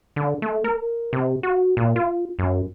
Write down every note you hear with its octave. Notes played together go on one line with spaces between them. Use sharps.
D3
A3
A#4
C3
F#4
A#2
F4
F#2